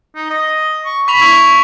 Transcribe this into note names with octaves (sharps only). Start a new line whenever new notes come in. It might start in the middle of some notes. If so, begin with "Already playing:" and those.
D#4
D#5
C#6
B5 C#6 B6 F7
E4